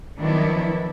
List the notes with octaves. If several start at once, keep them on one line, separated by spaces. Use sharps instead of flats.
D#3 F3 F#3 B3 D4 E4